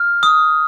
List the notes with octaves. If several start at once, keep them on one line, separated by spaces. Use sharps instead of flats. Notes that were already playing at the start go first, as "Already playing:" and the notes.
Already playing: F6
D#6